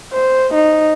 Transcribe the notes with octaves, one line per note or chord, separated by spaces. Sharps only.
C5
D#4